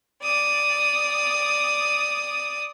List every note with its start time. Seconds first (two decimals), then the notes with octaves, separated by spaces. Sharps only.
0.24 D5 D#6